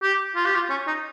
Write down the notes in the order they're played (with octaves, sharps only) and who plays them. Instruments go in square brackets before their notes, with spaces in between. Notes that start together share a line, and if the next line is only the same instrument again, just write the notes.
[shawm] G4
F4
G4
F4
C#4
D#4